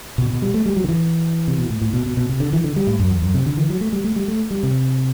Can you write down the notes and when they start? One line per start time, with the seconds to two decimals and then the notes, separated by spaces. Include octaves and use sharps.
0.18 B2
0.30 B2
0.42 G3
0.54 A3
0.66 G3
0.77 F#3
0.84 D3
0.89 E3
1.48 C3
1.58 B2
1.70 A2
1.82 A2
1.93 B2
2.06 B2
2.17 B2
2.29 C3
2.40 D3
2.53 E3
2.64 D3
2.76 G3
2.87 A2
3.00 F#2
3.11 E2
3.22 F#2
3.34 C3
3.46 D3
3.57 E3
3.70 F#3
3.81 A3
3.93 G3
4.04 A3
4.16 G3
4.28 A3
4.51 G3
4.63 C3